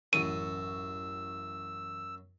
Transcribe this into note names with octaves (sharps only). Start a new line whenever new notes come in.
A1 F#2 C#6 E6 D#7